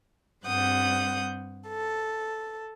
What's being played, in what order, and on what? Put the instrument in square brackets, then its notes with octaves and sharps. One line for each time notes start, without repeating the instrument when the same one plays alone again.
[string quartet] G2 G3 C4 F#5 D#6 G6
A4